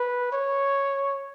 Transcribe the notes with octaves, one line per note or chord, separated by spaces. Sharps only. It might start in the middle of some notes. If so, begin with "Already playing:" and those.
Already playing: B4
C#5